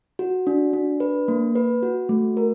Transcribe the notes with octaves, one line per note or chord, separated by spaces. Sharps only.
F#4
D4
D4
B4
A#3
B4
F#4
A3
A#4